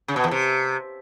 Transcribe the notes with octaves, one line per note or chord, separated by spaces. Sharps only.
C#3
B2
E2
C3